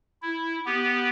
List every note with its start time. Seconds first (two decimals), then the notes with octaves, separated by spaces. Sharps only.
0.22 E4
0.66 B3 G4